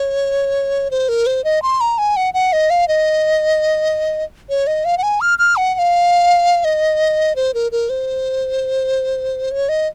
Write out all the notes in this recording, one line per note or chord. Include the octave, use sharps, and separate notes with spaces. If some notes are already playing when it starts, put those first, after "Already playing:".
Already playing: C#5
C5
A#4
C5
D#5
C6
A#5
G#5
F#5
F#5
D#5
F5
D#5
C#5
D#5
F5
F#5
G#5
F6
F6
F#5
F#5
F5
D#5
C5
A#4
A#4
C5
C#5
D#5